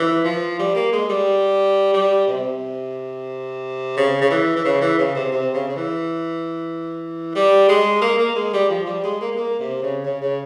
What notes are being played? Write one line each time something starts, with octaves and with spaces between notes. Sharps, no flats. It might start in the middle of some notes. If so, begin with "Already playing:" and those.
Already playing: E3
F3
G3
A#3
G#3
G3
G3
C3
C#3
C#3
E3
E3
C#3
E3
C#3
C3
C3
C#3
C#3
E3
G3
G#3
A#3
A#3
G#3
G3
F3
G3
G#3
A#3
G#3
A#3
C3
C#3
C#3
C#3